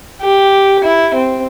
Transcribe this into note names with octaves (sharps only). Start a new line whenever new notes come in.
G4
E4
C4